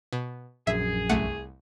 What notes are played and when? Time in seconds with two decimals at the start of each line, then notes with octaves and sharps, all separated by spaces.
0.13 B2
0.67 A#1 F#2 G#4 E5
1.10 C2 A3 F#5